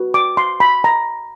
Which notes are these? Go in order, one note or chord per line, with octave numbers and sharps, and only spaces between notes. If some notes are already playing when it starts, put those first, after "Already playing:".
Already playing: F#4 B4
D6
C6
B5
A#5